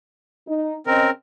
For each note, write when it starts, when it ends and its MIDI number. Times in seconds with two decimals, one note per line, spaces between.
0.48 0.76 63
0.87 1.09 49
0.87 1.10 60
0.87 1.10 70
0.87 1.09 75